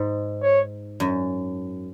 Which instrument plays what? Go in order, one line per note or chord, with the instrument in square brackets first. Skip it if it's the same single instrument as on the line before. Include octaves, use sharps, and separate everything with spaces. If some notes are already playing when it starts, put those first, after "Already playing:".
Already playing: [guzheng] G#2
[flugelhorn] C#5
[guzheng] F#2